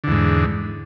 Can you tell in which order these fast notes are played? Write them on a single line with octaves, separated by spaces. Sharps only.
D3 E2 G#2